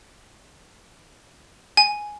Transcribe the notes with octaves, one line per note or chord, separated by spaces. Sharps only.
G#5